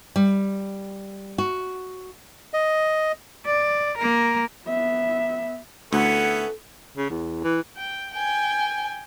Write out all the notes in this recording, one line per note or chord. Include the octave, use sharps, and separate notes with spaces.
G3
F#4
D#5
D5
A#3 A#4
B3 E5
D2 B3 C#4 E4 A4 F#5
C#3
E2
E3
G5
G5 G#5